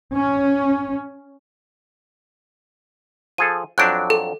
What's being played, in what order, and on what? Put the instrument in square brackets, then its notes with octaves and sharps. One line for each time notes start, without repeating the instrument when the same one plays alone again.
[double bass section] C#4
[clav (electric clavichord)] F3 G#4 A4 [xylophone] D#7
[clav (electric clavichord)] F2 F#3 D4 [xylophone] F#6 G6 D7
[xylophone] A4